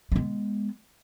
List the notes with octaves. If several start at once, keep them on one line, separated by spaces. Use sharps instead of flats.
G#3 B3